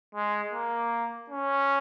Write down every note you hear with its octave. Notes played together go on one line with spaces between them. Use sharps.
G#3
A#3
C#4